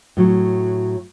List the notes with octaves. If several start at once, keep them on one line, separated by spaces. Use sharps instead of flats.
A2 F#3